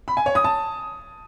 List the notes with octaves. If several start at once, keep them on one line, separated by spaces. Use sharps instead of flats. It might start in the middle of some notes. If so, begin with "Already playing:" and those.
B5
G#5
C#5
D#6
A5